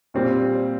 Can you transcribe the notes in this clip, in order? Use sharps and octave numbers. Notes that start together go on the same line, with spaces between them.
A#2 G3 C4